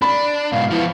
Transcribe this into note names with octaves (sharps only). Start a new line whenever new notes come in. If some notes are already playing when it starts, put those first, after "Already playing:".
D4 B5
G#2 B2 F5
F3 B3 E4